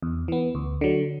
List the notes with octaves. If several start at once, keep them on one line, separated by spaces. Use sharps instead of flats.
E2
E3 B3
D2
D3 F#3